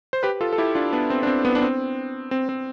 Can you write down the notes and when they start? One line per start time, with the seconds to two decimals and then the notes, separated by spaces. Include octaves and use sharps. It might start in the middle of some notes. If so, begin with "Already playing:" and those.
0.13 C5
0.23 G4 B4
0.41 F4 A4
0.53 A4
0.58 E4 G4
0.75 D4 F4
0.93 B3 D4
1.10 C4
1.23 D4
1.27 C4
1.45 B3
1.55 D4
1.62 C4
2.31 C4
2.49 C4